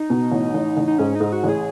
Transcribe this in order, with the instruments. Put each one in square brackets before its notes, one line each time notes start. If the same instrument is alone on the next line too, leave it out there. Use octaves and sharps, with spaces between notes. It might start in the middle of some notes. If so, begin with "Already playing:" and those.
Already playing: [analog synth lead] D#4
[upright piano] B2
A1
A1
A1
[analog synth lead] D#4
[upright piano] G#2 [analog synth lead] C#4
[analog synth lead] D#4
[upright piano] G#2
[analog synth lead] F#4
[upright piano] A1
[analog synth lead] G#4